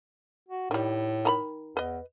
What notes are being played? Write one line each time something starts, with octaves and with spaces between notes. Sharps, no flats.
F#4
A2 D#3 G3
D#3 A#5 B5
E2 B4 D#5